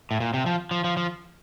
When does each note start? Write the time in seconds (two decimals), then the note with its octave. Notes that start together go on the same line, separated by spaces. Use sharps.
0.11 A2
0.20 A#2
0.34 C3
0.46 F3
0.71 F3
0.84 F3
0.97 F3